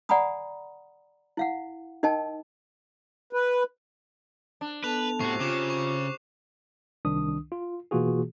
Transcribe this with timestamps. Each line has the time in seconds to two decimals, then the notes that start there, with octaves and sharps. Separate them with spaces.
0.09 D5 F#5 G#5 A#5 B5 D#6
1.37 E4 F5 F#5
2.03 D#4 A#4 D#5 G5 A5
3.33 B4
4.61 D4
4.84 B3 A4 B4 A5 F#6 F7
5.20 A2 C3 F#4 C#6 C7
5.40 C#3 F4 D6 E7
5.70 C#6
7.05 C2 D#3 D4 D#6
7.52 F4
7.91 B2 E3 A#3 F4 F#4 G#4